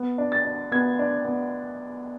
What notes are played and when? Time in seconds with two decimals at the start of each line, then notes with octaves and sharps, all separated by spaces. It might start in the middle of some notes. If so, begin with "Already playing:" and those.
Already playing: B3
0.18 D4
0.32 A6
0.44 D4
0.72 B3 G#6
0.99 D4
1.25 B3